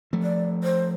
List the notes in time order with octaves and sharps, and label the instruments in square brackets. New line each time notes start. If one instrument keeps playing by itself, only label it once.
[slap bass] F3 A3
[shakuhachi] D5
C5